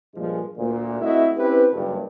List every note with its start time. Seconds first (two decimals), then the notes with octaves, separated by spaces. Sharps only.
0.15 G2 A#2 F3 G#3
0.57 D2 A#2
1.01 A3 C4 E4 F#4 D#5 E5
1.37 C4 C#4 E4 G4 B4
1.71 F#1 G2